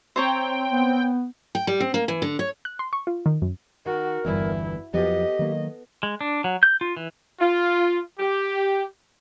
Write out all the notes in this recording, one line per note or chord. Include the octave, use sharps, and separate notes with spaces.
C4 C5 C#5 G5 A#5
B3
G5
G3
C4
A#3
E3
D3
C#5
F#6
C6
C#6
F4
D#3
F#2
D#3 F#4 A#4
G1 E2 G2 E3 A#3 E4
F2 F3 F#3 B3 G4 A4 D#5
D#3 F#3 A#3
G#3
D4
F#3
G6
F4
E3
F4
G4